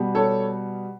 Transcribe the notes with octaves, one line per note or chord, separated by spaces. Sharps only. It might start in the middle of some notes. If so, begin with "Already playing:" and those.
Already playing: B2 G3
A4 C#5